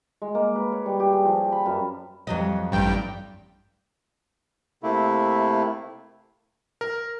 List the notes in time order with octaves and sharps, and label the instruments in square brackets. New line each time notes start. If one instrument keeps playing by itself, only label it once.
[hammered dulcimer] G#3
A#3
B4
C#5
G3
G4
G#4
F3
G4
B5
F#2
[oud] F2 F#3 D#5
[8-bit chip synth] A1 G2 G5
[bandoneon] C3 A3 A#3 E4
[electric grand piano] A#4